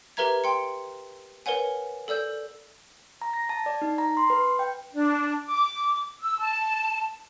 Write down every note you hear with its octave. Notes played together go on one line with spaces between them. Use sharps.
G4 A#4 B4 E5 A#5 G#6
G5 C6 C#7
A#4 B4 C#5 F#5 G#5
A4 D5 E6 G6
A#5
A#6
A5
D5
D#4
A#5
C6
B4
G5
D4
D6
E6
A5